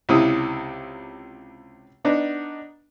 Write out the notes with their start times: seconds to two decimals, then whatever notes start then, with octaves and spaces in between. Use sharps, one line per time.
0.09 C#2 C3 E4 D#6
2.05 B3 D4 D#4